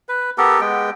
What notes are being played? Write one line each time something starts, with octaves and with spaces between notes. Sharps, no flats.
B4
B3 G4 A4 A#4
G#3 B3 G5